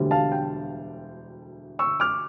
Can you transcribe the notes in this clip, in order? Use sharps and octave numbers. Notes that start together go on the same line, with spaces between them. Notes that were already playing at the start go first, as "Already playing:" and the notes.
Already playing: E1 D2 D3 G3
F5 A5
G5
C#6 E6
D6 F6